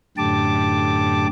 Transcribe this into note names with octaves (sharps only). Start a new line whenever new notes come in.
F#2 A2 D3 G4 A5 D6